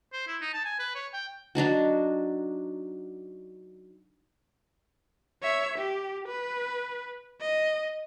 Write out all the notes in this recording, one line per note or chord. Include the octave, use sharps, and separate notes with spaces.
C5
E4
D#4
A5
G#5
B4
C#5
G5
F#3 D4 D#4 F#4
C#5 E5
G4
B4
D#5